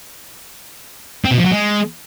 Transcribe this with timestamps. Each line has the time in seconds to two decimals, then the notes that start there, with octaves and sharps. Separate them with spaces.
1.25 C4
1.31 B2
1.38 F3
1.45 F#3
1.52 G#3